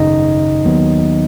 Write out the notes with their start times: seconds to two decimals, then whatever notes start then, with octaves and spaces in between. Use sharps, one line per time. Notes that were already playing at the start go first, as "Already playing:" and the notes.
Already playing: G#1 F#2 C#3 D#4 D#5
0.65 D#2 D#3 F#3 B3